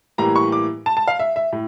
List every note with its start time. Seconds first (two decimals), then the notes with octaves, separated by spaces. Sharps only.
0.18 A2 E3 G3 A#3 A#5
0.36 C#6
0.52 D6
0.86 A5
0.97 A5
1.08 F5
1.19 E5
1.36 E5
1.53 A2